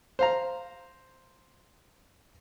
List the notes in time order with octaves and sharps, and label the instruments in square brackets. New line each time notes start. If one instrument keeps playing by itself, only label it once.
[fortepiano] C5 F5 A#5